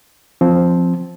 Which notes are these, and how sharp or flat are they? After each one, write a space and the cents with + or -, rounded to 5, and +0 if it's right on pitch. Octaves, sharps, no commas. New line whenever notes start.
F3 +0 C4 +0